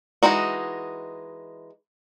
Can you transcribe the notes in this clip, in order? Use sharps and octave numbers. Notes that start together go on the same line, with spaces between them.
E3 G#3 D#4 F#4